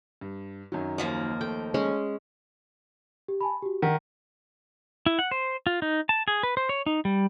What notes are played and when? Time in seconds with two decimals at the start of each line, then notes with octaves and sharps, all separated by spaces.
0.21 G2
0.72 F#2 D#3 F#3
0.98 D#2 F3 A#3
1.41 A3 G5
1.74 G#3 C#4
3.28 G4
3.41 G#5 A5 B5
3.62 F#4 G4
3.82 D#3 F#5 B6 D#7
5.06 E4
5.19 F#5
5.31 C5
5.67 F4
5.82 D#4
6.09 A5
6.28 G#4
6.43 B4
6.57 C5
6.69 C#5
6.86 D#4
7.05 G3